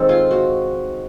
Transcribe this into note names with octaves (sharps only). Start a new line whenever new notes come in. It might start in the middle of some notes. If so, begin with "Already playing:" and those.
Already playing: D#3 G#3 C4 A4
F4
F#4